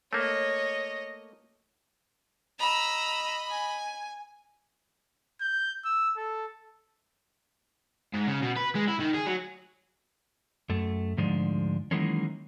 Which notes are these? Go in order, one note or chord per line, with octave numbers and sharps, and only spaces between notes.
A3 A#3 C#5 D#5
D#5 A#5 B5 E6
G#5
G6
E6
A4
G#2
C#3
B2
B4
G#3
E4
D#3
G#4
F#3
F#2 A3
D2 G#2 F3 G#3 D4
D#3 E3 F#3 G#3 A#3 C#4